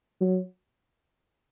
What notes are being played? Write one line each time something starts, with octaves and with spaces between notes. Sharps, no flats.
F#3